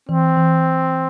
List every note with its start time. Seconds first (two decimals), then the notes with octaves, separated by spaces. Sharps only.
0.09 E3 C4
0.37 E3